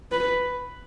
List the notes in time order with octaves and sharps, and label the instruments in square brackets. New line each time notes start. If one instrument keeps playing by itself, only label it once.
[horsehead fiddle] B4